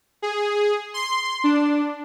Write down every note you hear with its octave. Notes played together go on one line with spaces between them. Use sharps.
G#4
C6
D4